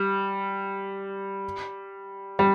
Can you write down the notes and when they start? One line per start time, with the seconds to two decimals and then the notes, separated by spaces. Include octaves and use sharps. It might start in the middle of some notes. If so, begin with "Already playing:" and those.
Already playing: G3
2.39 G3